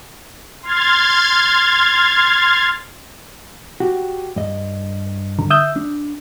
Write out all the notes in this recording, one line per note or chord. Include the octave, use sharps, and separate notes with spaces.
C6 F6 G#6 A6
F#4 G4
G2 D#5
D3
E5 D#6 E6 G6
D4